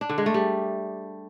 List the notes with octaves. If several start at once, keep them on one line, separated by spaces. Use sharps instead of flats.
D4
D3
G#3
A3
G3